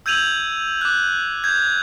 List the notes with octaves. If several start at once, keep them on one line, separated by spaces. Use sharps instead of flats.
E6 G6 G#6 D#7 F7 F#7
D6 F#6
G6 G#6